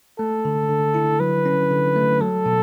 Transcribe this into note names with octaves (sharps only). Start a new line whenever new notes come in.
A3 A4
D3
D3
E4
F#3 B4
C#4
D3
A3
F#3 A4
B2